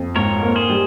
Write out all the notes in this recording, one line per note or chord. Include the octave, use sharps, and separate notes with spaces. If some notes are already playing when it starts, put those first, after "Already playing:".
Already playing: F2
G#2 A#4 C#5
A#3
G#4 C5
G3